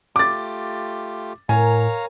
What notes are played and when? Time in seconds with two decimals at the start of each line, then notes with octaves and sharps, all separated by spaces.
0.16 A3 F4 G4 D6 A6
1.49 A2 A#4 C#5 F5 G#5 A#5